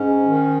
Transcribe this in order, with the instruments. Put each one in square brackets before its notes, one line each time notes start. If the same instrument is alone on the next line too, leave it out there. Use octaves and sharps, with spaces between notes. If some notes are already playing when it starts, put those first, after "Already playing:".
Already playing: [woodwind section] G#2 C#4
D#3